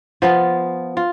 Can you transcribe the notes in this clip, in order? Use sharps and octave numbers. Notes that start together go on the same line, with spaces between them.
F3 B3 F4
F4